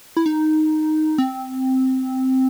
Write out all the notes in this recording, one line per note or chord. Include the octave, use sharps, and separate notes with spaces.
E4
D#4
C4